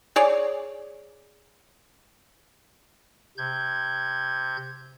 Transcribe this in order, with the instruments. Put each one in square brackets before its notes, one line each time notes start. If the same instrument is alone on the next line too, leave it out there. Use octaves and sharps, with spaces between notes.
[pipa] G#4 C#5 D5
[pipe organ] C3 G6 G#6